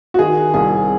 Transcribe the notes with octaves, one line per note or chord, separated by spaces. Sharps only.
F#4
D#3 G#4
C2 G#4